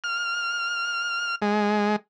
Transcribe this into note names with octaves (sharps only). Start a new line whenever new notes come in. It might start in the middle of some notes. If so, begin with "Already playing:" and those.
F6
G#3